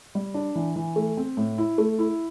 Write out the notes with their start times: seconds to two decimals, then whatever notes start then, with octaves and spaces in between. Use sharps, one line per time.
0.15 G3
0.34 D4
0.55 E3
0.76 E3
0.96 A3
1.17 C4
1.37 A2
1.58 E4
1.78 A3
1.99 E4